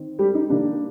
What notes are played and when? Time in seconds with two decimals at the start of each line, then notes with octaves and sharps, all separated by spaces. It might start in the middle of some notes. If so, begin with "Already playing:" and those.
Already playing: D#3 C4
0.19 G3 G4
0.35 D#4
0.50 D#3 A#3 D4